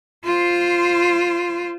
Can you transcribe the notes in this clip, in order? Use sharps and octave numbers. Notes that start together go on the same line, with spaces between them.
F4 C5